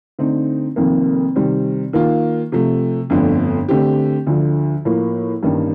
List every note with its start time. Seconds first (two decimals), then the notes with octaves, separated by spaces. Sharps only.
0.19 D3 A3 C4 D#4
0.76 F1 F2 D#3 A#3
1.36 C3 D#3 G3 C4
1.93 D#3 A#3 F4
2.52 C3 F3 A3
3.10 G1 F2 D3 A3
3.69 D3 A3 C4 G4
4.27 D2 D3 F3
4.85 A2 F3 A#3
5.43 A1 G2 D#3 A#3 D#4